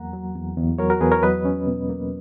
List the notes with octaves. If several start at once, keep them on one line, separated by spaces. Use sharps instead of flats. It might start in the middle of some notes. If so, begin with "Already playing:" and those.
Already playing: E2 F#3 A#3 F#5 A#5
F#3
E2
E2
F#3 A#4 C#5
F#4 A#4
E2 G#4 B4
A#4 C#5
F#3 B4 D#5
C#4
B2
A#3